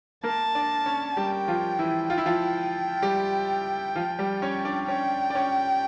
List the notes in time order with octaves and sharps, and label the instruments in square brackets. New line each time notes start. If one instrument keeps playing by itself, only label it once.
[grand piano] A#3 A#4 [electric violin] A5
[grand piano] D4 D5
C#4 C#5
[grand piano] G3 G4 [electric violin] G5
[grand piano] F3 F4
E3 E4
[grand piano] F4 [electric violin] G5
[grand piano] E4
F3 F4
G3 G4
F3 F4
G3 G4
C#4 C#5
D4 D5
[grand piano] C#4 C#5 [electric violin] G5
[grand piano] D5
C#4 C#5